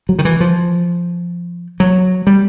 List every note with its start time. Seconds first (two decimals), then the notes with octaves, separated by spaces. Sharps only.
0.09 F#3
0.19 D#3
0.25 E3
0.41 F3
1.80 F#3
2.27 G3